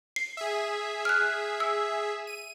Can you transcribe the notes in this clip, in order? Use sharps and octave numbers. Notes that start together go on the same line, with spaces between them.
C7
G#4 E5
F6 F#6
E6
D#7